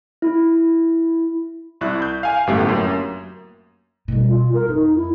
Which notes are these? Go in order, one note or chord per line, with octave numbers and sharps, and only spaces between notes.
E4
C2 E4 F#6
G6
F5 G#5
G1 F#2 A2 A3 B3 G4
F#2 A#3
B2 G3
F4
A#4
F2 D#4
E4